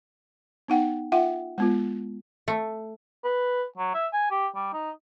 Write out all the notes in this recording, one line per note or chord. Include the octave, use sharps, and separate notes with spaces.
B3 D#4 F#5 G5
F4 E5 F#5 G5
G#3 B3 F4
A3
B4
F#3
E5
G#5
G4
G3
D#4